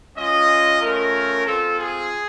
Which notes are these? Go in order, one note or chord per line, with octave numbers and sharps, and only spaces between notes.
G#3 C#4 F4 D#5
A3 C#4 F4 A#4
G#3 C4 F4 A4
G#4